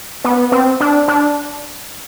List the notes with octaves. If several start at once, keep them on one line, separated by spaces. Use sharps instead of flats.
B3
C4
D4
D4